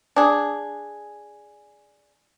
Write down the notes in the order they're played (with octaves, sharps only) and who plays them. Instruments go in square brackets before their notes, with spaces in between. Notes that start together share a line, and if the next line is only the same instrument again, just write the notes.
[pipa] D4 G#4